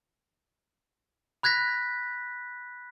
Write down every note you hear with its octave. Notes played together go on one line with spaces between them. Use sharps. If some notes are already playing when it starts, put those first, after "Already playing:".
B5 F#6 G#6 A#6 B6